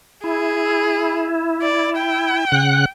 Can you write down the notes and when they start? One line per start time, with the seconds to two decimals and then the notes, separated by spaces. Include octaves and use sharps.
0.24 E4 G#4
1.62 D5
1.97 G5
2.52 C#3 F#5 F#6